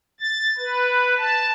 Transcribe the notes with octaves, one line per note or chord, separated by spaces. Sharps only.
A6
B4
A5